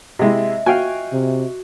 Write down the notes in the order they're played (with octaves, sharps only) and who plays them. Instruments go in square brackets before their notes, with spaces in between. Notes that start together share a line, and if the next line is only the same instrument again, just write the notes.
[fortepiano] C3 G#3 E4 [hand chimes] D#5 E5
[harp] F#4 [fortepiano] F5 G5 G#5
[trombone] C3